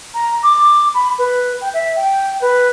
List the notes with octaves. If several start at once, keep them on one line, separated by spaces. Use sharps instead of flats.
A#5
D6
B5
B4
G5
E5
G5
B4